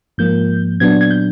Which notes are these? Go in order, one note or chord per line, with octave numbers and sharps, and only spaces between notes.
G#2 F3 A#3 G6
A#2 F#3 B3 D4 G#6
G#6
G6